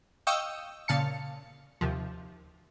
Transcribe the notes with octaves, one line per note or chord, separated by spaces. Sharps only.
D#5 F5 G5 C#6 D#6 E6
A#2 C#3 F5 A5 C#7
D#2 C3 F3